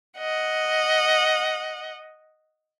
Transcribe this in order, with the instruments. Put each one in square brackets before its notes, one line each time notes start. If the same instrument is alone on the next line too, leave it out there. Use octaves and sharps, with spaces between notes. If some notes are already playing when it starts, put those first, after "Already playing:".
[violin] D#5 F#5